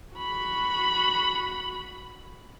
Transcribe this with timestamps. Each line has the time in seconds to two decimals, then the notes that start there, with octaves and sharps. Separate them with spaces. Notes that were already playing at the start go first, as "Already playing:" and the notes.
0.15 F#4 B5